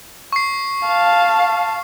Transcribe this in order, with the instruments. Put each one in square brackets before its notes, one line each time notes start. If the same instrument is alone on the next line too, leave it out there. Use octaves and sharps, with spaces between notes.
[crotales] C#6 C7
[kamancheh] F5 A5